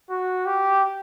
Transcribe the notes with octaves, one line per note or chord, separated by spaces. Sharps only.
F#4
G4